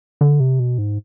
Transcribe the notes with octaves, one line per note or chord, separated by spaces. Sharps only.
D3
C3
B2
G#2